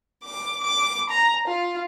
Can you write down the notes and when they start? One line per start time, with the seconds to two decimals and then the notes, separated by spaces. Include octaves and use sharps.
0.24 D6
0.64 D6
1.09 A#5
1.46 F4